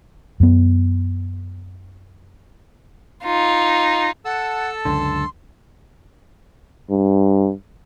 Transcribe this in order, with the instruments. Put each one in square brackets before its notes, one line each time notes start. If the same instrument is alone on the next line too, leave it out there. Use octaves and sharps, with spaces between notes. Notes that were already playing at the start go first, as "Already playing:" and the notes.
[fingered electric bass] F#2 B3
[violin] D#4 F4
[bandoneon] A4 A5 E6 [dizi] F#5
[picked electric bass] C#2 F#2 D3 [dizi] C6
[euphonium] G2